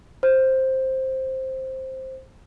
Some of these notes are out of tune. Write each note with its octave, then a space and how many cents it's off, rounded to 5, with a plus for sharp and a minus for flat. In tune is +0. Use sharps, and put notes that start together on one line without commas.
C5 +5